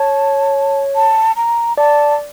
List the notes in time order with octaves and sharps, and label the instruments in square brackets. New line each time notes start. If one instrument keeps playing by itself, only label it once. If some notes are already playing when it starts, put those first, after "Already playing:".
Already playing: [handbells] C#5 [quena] A5
[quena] A5
A#5
[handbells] D5 [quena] A5